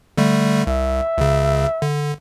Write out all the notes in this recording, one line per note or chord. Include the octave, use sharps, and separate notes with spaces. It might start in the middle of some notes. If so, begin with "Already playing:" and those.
D3 G3 A3
C2 E5
C#2 C#3
D3